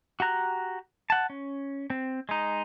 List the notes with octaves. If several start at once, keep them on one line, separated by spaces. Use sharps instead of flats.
F#4 G4 A#5 F#6
F#5 A5
C#4
C4
G#3 D#4